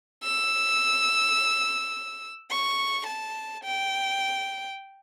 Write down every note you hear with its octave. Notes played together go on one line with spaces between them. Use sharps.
E6
C#6
A5
G5